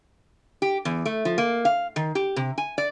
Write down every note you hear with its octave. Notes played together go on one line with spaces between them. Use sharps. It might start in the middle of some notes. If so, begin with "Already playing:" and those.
G4
E2
A3
F3
A#3
F5
D#3
G4
C3
G#5
D5